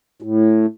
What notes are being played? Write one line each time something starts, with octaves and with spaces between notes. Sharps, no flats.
A2